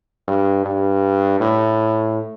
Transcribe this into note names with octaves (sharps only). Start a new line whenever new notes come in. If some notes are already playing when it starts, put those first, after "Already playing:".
G2
G2
A2